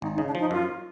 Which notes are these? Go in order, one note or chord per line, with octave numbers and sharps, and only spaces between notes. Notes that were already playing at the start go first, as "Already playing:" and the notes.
G#1 D#4
D#4
C#3
D4
F3 D#4
F#2 F4